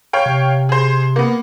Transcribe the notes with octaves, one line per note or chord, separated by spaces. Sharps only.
C#5 F5 G5
C3
G#4 C5
A#3 B3